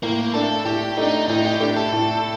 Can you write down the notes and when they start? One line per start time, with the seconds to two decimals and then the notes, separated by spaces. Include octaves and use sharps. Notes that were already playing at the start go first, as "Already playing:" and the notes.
0.03 A2 A#3
0.34 A3 D4 A4
0.65 A2 G4
0.97 A3 D4 D#4
1.28 A2 D#4
1.45 G4
1.60 A3 D4 G4
1.76 A4
1.92 A2